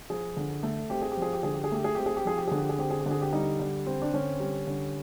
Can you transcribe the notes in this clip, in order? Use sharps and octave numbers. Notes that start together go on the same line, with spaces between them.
F3 G#4
D3
A3
C4 G4
G#4
G4
F3 G#4
G4
D3 G#4
G4
G#4
A3 G4
G#4
C4 G4
G#4
G4
F3 G#4
G4
D3 G#4
G4
G#4
C4 G4
G#4
G4
D3
G#4
G4
G3 D#4
D3
C4
D4
D3 C#4
G3
D3